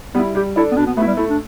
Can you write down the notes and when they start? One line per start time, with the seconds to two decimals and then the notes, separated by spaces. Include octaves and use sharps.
0.15 G3 B3
0.19 E4
0.35 G3 G4
0.56 D4 E4 A4
0.72 B3
0.77 B2 D4
0.87 B3
0.97 A3 B3
1.02 E4
1.07 G3
1.17 A3 E4
1.30 D4